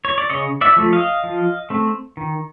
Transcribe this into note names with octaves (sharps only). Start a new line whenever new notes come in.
C#5
D5
C#3 C#5 D#5
D5 E5
F3 A3
D#5 F5
F3
A3 C4
D#3